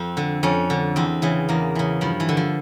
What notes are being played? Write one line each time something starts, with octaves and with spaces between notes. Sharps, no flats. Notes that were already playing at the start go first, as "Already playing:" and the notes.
Already playing: F2 C4
D3
F2 C#4
D3
E2 C4
C#3 E3
E2 A#3
C#3 E3
G2 F3
E3
D3
F3